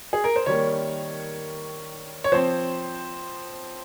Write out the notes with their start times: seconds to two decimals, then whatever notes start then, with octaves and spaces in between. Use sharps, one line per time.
0.13 G#4
0.24 A#4
0.36 C5
0.46 D#3 G3 A#3 C#5
2.24 C#5
2.32 F3 C4 C5